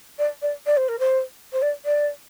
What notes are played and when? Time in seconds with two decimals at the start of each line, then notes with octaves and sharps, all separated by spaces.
0.18 D5
0.42 D5
0.66 D5
0.77 C5
0.88 A#4
0.99 C5
1.53 C5
1.62 D5
1.85 D5